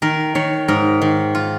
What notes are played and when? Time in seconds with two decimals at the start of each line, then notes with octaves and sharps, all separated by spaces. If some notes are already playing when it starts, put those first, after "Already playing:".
0.02 D#3 A#4
0.35 D#3 C#5
0.68 G#2 A#4
1.01 D#3
1.35 F4